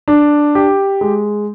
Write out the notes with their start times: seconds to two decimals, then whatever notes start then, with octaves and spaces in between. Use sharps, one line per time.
0.08 D4
0.55 G4
1.01 G#3